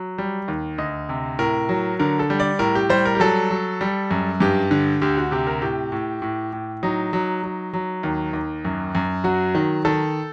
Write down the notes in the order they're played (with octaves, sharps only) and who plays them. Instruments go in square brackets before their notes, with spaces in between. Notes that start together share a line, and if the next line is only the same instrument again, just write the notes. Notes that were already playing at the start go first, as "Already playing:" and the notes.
Already playing: [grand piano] F#3
G3
D#2
D2 D#5
C3
A2 A#4
F#3
D3 A#4
A4
G3
D5
A2 A#4
G4
G3 C5
A#4
G4
F#3 A4
F#3
G3
F#2
G2 G4
D3
D2 G4
F#4
C3 G4
A#4
A2 G4
A2
A2
A2
F#3 D#4
F#3
F#3
F#3
D#2
D#2
F#2
F#2
F#3 F#4
D#3
D#3 A4